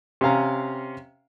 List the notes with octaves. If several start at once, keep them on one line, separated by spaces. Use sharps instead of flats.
C3 C#4 F5 A#5